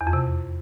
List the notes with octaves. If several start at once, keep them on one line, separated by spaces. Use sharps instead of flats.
E2
F2
C3